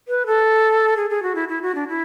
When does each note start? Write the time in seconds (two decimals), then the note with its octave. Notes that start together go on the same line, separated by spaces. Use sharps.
0.08 B4
0.26 A4
0.97 G#4
1.10 G#4
1.23 F#4
1.35 E4
1.49 E4
1.62 F#4
1.75 D4
1.88 E4